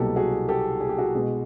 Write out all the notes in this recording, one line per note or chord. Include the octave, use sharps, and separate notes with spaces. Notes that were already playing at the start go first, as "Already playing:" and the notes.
Already playing: C2 B2 F#3 A#3 G4 A4
F#4 G#4
G4 A4
G#4
G4
F#4 G#4
B2 G#3 B3